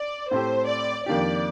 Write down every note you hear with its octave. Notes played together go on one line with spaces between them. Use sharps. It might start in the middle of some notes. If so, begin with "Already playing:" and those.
Already playing: D5
A2 A3 C4 G4 C5
D5
F2 D#3 A#3 D4 G4 D5